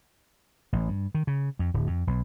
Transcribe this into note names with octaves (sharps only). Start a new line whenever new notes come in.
A1
G2
D#3
C#3
F2
D1
F2
B1